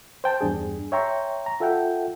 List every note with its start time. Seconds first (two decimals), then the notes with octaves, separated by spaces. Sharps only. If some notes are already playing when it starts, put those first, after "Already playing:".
0.24 C5 G5 A5
0.41 E2 G2 D4 G#4
0.92 C#5 E5 G5 A#5 C6 C#6
1.46 A#5
1.60 F4 A4 E5 F#5 G5